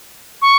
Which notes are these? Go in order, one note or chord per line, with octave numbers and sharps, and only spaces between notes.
C#6